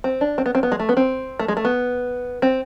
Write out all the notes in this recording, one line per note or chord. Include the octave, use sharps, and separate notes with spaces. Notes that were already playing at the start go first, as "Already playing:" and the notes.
C4
D4
C4
B3
C4
B3
G#3
A3
B3
C4
A3
G#3
A3
B3
C4